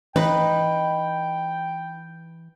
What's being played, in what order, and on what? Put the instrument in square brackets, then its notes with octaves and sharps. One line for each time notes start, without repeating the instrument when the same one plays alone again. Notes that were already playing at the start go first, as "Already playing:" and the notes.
[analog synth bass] E3 [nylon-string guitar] D#4 [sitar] B4 [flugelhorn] G5